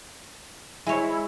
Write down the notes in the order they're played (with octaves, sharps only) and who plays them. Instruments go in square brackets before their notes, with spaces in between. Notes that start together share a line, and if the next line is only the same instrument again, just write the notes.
[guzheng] G#3 C#5 [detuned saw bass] E4